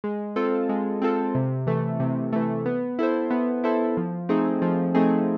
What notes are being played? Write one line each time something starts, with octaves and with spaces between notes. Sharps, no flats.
G#3
C4 F4 A4
G#3
C4 F4 A4
C3
E3 A3
C3
E3 A3
B3
E4 A4 C5
B3
E4 A4 C5
F3
A3 C4 D#4 G#4
F3
A3 C4 D#4 G#4